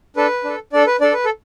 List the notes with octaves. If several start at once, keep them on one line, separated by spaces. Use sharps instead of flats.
D4 A4 B4
D4 A4
D4 A4 D5
B4
D4 A4 D5
B4
A4